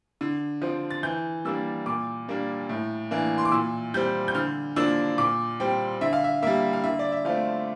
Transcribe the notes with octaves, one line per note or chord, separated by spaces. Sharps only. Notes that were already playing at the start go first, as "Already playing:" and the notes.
D3
F3 C4
A6
E3 G6
G3 A#3 D4 E6
A#2 D6
G3 A#3 D4
A2
E3 A#3 D4
C6
D6
A#2 E6
G3 C4 G6
G6
D3 F6
F3 A#3 D4 E6
A#2 D6
G3 C4 G5
D3 E5
F5
E5
G3 A#3 E5
F5
D3 E5
D5
E5
F3 A3 C4 F5